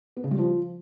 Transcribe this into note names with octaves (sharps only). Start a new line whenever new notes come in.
B3
C#3
G3
F3